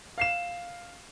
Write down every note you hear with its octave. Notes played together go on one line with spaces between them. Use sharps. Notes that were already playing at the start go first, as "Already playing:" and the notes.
F5 C7 E7